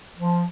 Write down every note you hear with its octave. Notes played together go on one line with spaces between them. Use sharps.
F3